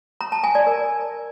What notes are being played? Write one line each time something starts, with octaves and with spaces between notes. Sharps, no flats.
A#5
A5
G#5
D5
A#4